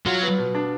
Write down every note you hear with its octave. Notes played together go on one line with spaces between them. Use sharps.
F#3 F4
B3
B2
D4